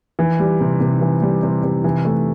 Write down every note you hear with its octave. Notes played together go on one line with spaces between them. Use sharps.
E3
G3
C3
C3
E3
G3
C3
C3
E3
A3